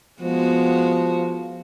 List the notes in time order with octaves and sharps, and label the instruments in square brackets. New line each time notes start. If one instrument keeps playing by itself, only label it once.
[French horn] F3 [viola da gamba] G#3 B3 F#4